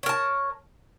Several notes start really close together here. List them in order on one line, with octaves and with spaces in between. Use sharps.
C#5 A#4 A5